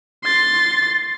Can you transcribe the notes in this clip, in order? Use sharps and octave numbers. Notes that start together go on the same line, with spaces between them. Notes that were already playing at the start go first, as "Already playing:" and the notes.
C6 A6